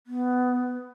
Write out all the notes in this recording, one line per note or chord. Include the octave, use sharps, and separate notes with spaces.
B3